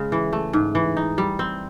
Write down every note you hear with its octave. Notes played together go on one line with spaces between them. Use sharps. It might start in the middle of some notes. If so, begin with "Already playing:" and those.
Already playing: C#3 G#3
E3
A3
G#2
E3
D#4
G3
C4